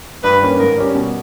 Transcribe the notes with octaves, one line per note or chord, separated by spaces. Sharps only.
G2 B4
D#3 A#3 C#4
G#2 A#4
G3 C#4 G4
B2